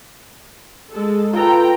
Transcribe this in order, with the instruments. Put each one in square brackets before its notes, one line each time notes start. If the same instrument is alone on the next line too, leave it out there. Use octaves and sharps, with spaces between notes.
[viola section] G#3 A4
[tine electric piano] F4 A4 B4 [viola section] G5 A#5